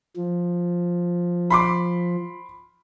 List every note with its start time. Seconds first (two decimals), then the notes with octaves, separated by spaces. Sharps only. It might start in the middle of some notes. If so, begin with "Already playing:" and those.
0.16 F3
1.50 B5 C6 D6